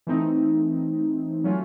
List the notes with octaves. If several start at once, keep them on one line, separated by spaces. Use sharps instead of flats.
E3 A3 C4 D#4
F#3 A3 C#4 F4